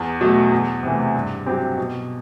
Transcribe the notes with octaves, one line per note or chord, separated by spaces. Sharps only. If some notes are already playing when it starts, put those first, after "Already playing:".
Already playing: E2
B2 F#3 A3
E2
C3 E3 A3
G2
F#3 C4 E4 G4
B2